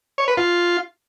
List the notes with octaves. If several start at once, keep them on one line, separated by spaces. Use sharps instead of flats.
C#5
B4
F4